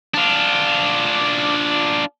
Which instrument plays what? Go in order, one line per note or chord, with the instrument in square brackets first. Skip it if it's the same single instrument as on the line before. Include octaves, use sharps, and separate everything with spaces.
[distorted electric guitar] D4 F4